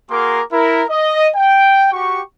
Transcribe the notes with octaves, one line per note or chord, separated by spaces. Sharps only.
A#3 F#4 G#4 A#4 C6 D6
E4 A#4
D#5
G5
F#4 G4 C#6